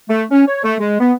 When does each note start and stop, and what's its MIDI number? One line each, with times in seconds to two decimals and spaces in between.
0.10 0.24 57
0.31 0.44 61
0.47 0.63 73
0.64 0.76 57
0.80 0.97 56
1.00 1.13 59